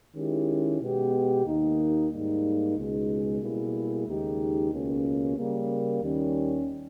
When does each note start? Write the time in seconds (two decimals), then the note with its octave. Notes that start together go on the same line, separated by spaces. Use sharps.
0.14 D#3 G#3 C#4 E4 G4
0.80 B2 G#3 B3 G4
1.45 D#2 D#3 A#3 D#4
2.10 G#2 G3 A#3 D#4
2.76 C#2 B2 G#3 D#4
3.41 B2 G3 A#3 E4 G#4
4.06 D#2 C#3 G#3 D#4 G4
4.71 C#2 B2 A#3 C#4
5.37 C#3 G3 A#3
6.02 D#2 D#3 G3 C#4